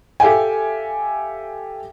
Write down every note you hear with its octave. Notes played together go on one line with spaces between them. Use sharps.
G4 A4 E5 F5 G5 G#5